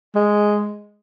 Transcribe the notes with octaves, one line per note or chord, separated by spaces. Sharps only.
G#3